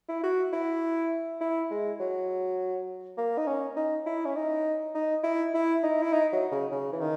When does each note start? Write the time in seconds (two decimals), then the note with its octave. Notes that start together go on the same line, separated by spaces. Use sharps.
0.09 E4
0.23 F#4
0.53 E4
1.41 E4
1.71 G#3
2.00 F#3
3.18 A#3
3.38 D#4
3.47 C#4
3.77 D#4
4.06 E4
4.25 C#4
4.36 D#4
4.95 D#4
5.24 E4
5.54 E4
5.83 D#4
6.02 E4
6.13 D#4
6.33 F#3
6.52 C#3
6.72 C#3
6.93 E3
7.01 D#3